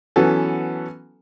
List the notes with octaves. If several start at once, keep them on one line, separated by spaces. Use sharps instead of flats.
E3 F#3 B3 C#4 A4